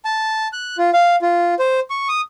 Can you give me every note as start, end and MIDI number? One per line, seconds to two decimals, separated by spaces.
0.05 0.48 81
0.53 0.77 90
0.78 0.91 65
0.93 1.16 77
1.22 1.54 65
1.59 1.80 72
1.90 2.08 85
2.09 2.21 87